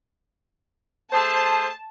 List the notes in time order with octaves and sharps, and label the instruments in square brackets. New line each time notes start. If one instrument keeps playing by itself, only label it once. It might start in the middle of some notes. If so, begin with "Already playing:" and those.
[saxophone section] A3 G#4 C5 [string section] A5